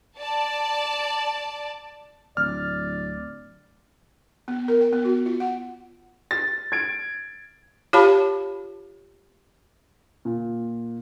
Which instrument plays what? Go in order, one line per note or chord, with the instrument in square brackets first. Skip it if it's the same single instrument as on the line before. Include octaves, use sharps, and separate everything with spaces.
[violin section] D5 A5
[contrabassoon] D1 [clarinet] D5 [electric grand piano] F6
[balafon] B3
A#4
G5
B3
F#4
F4
F#5
[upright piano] A6
G#6 D7
[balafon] F4 G4 C#5 F5 A5 B5
[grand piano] A#2